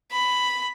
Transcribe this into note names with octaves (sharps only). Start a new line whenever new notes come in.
B5